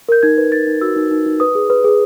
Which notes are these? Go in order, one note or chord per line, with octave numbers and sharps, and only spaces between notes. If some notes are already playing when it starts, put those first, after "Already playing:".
A#4 G6
D#4 G#6
B4
D#4 A6
D#4
F#4 E6
D#4
D#4
D#4
B4 D#6
G#4
B4
G#4